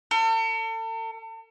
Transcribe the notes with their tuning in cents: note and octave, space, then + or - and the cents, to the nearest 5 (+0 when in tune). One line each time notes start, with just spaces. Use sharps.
A4 +40